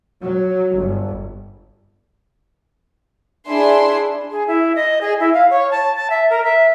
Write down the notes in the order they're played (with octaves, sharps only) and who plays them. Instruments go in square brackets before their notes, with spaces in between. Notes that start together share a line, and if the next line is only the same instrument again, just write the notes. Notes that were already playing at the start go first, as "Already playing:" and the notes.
[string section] F#3
G1
[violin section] D4 E4 G#4 E5 C6
[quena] G#4
E4
D#5
G#4
E4
F5
C#5
A5
A5
E5
A#4
E5